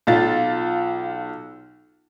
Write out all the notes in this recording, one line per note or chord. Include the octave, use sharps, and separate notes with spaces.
B1 F4 A6